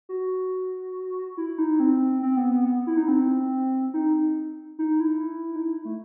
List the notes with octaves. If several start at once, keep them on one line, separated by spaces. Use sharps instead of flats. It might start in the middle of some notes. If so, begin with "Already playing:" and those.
F#4
E4
D#4
C4
C4
B3
B3
B3
E4
D#4
C4
D#4
D#4
E4
D#4
E4
A3